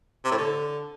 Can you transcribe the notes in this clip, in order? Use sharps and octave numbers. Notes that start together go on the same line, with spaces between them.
C3
A2
D3